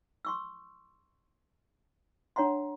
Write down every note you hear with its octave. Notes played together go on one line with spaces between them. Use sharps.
C6 C#6 E6
D4 C#5 F#5 A#5 C6